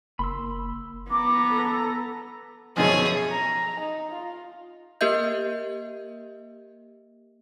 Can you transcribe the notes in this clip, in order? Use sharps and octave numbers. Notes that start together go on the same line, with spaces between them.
F#1 A#3 B5 C6 E6
B3 A#5 D6
A4
F#2 B2 F3 G#4 C#5
A#5
D#4
F4
A#3 G4 A#4 D#5 E5 G6